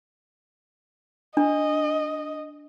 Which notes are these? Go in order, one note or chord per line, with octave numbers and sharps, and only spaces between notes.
D4 D#5